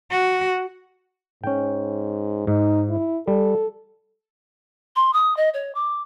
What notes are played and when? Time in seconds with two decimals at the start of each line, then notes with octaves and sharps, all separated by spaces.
0.11 F#4
1.44 G#2 C#4 G5
2.47 G#2 D#4
2.90 E4
3.28 G3 A4
4.96 C6
5.13 D#6
5.37 D#5
5.54 C#5
5.75 D6